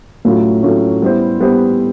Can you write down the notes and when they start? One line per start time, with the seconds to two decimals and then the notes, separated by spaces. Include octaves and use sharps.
0.25 A2 F#3 A3 C#4 F4
0.63 A2 F#3 A3 C#4 F4
1.02 G3 B3 E4 G4 C5
1.40 G3 B3 E4 G4 C5